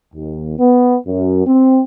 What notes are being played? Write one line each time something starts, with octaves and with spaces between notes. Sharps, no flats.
D#2
B3
F#2
C4